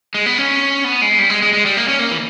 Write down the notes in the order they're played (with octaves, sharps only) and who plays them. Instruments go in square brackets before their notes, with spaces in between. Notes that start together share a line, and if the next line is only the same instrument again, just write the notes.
[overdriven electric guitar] G#3
B3
C#4
B3
G#3
G3
G#3
G#3
G#3
G3
A#3
C#4
A#3
E3